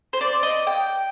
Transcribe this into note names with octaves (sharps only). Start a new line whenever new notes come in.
C5
D5
D#5
G5